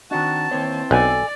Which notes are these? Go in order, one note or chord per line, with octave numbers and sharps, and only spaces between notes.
D#3 C4 D4 F#4 A5
D#2 E3 C4 C#5
B1 A4 D5 G#5